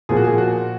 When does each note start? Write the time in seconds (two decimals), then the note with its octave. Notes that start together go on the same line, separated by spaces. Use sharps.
0.09 A#2 F3 G#4
0.17 F#4
0.24 G#4
0.38 F#4